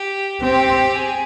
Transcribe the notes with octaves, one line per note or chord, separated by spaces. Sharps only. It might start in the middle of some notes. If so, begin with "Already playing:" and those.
Already playing: G4
C4 G4
G#4